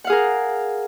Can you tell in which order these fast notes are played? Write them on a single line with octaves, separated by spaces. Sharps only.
F#5 F5 G#4 A#4